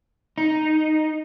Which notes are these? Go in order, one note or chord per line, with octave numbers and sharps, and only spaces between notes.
D#4